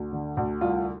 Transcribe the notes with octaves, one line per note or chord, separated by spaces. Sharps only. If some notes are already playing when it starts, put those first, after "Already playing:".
Already playing: D2
D3
D2
C2 F4